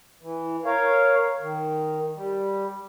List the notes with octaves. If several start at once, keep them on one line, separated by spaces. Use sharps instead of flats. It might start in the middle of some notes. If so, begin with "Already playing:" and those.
E3
A#4 C#5 F5
D#3
G3